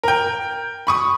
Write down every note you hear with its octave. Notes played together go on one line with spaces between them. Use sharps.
A#4 G5
B5 C#6 D#6